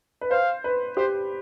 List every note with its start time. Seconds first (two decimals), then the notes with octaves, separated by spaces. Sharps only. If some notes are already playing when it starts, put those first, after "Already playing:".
0.21 B4
0.31 C5 F5
0.64 B4
0.97 G4 C5